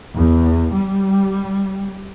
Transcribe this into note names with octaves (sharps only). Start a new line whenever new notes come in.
E2
G3